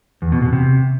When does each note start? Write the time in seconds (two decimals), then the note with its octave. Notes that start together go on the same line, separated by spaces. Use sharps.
0.22 E2
0.32 B2
0.42 B2
0.53 C3